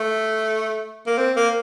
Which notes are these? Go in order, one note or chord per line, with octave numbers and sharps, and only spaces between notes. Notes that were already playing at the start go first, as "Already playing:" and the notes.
Already playing: A3
A#3
C4
A#3